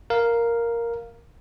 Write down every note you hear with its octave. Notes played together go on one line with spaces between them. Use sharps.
A#4 F5